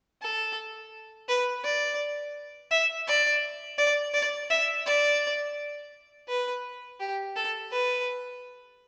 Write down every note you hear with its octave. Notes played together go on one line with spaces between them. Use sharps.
A4
B4
D5
E5
D5
D5
D5
E5
D5
B4
G4
A4
B4